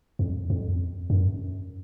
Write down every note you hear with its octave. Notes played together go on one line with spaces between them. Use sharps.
F2
F2
F#2